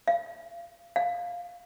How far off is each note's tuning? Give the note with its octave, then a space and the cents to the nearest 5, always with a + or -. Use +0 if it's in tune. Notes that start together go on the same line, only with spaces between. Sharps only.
F5 -30
F5 +10